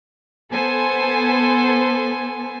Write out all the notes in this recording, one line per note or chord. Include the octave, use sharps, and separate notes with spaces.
B3 A4 C5 G#5